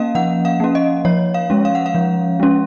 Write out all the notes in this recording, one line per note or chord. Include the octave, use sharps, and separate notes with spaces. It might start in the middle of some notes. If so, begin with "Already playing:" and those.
Already playing: A#3 C#4 D#5 F5
F3 F#5
F5
A#3 C#4
D#5
F3 C#5
F5
G#3 C#4
F5
F#5
F5
F3
G#3 C#4